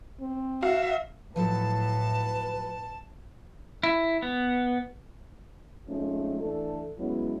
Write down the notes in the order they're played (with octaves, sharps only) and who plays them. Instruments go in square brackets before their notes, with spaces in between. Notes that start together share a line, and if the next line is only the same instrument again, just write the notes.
[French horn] C4
[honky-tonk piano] F#4 F5 [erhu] E5
[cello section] A2 [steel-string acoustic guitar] F3 F#3 A4 [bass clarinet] B4 [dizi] A5
[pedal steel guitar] E4
B3
[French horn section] F3 G#3 A3 C4 C#4 D#4
E3 A3 D4 A4
F#3 G#3 B3 C#4 E4